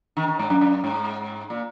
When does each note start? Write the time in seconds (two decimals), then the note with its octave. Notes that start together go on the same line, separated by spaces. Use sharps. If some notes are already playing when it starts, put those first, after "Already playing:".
0.17 D#3
0.28 D#3
0.39 G#2
0.50 F#2
0.61 F#2
0.84 G#2
1.50 A#2